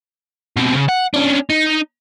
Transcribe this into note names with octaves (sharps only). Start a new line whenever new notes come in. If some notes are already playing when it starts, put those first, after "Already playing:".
B2 C4
C#3
F#5
C#4 D4
D#4